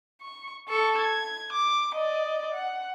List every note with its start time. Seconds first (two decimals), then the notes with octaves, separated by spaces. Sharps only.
0.22 C#6
0.68 A4 C#6
0.98 G#6
1.53 D6
1.95 D5 D#5
2.54 F#5